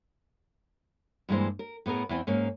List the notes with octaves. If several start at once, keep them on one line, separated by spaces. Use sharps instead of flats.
G2 E3 G#3 A#3 E4 C5
A#4
A2 B3 G#4 A#4
E2 E3 C4
G#2 A#3 C#4